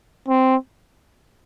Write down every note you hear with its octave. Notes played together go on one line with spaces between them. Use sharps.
C4